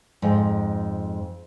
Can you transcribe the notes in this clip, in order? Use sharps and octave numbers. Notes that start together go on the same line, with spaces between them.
F2 G#2